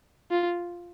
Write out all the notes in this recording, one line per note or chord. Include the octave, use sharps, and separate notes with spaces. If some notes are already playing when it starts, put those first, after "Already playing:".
F4